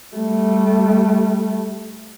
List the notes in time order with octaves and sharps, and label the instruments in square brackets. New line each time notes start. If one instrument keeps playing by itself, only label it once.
[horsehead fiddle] G3 A3